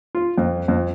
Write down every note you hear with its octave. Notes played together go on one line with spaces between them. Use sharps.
F4
F2
F2